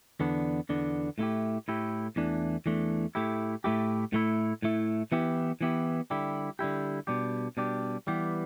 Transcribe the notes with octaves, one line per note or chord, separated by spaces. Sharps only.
E2 D3 B3 D4
E2 D3 B3 D4
A2 A3 E4 G4
A2 A3 E4 G4
E2 E3 A3 D4
E2 E3 A3 D4
A2 A3 E4 G4
A2 A3 E4 G4
A2 A3 E4
A2 A3 E4
E3 B3 E4 G4
E3 B3 E4 G4
D3 G3 E4 G4
D3 G3 E4 G4
B2 G3 D4 G4
B2 G3 D4 G4
E3 G3 B3 G4